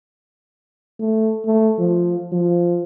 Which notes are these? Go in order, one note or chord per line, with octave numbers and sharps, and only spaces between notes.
A3
A3
F3
F3